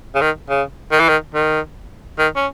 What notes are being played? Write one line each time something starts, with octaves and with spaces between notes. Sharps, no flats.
C#3
D#3
C#3
D#3
E3
D#3
D#3
D#3
C#4